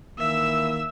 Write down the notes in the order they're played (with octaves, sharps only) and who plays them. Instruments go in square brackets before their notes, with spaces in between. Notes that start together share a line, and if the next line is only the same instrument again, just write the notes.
[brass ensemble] D#3 E3 A#3 [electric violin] E5 E6